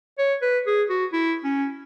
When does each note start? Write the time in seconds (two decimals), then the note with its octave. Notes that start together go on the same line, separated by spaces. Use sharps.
0.18 C#5
0.42 B4
0.67 G#4
0.89 F#4
1.13 E4
1.44 C#4